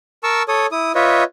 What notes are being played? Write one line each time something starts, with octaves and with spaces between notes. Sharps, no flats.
A#4 A5 C#6 E6
A4 C#5 D#6
E4 D#6
F4 B4 C#5 D#5 E5